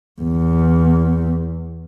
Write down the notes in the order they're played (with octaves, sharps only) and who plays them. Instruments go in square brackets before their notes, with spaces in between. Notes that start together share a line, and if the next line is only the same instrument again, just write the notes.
[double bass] E2